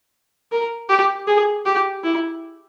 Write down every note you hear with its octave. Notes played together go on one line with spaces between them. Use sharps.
A#4
G4
G#4
G4
E4